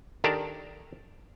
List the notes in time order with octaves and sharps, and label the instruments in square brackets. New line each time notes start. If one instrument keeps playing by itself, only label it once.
[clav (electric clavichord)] D#3 D4 G4 A4 A#4